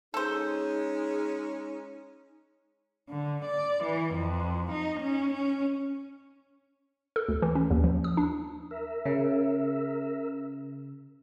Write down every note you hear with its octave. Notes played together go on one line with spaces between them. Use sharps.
G#3 C#4 D#4 G#4 A4 C5
D3
D5
E3
F2
D#4
C#4
C#4
A4
D2
E3
C#4
D#2
F3
D#6
D4
A#4 E5
C#3